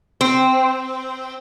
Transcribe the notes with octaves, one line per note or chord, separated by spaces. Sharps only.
C4